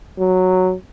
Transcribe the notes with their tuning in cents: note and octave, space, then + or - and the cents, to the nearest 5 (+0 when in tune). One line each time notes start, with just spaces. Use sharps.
F#3 -5